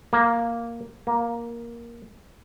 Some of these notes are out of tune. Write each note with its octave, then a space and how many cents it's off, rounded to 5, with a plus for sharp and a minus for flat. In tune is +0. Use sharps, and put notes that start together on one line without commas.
A#3 +0
A#3 +10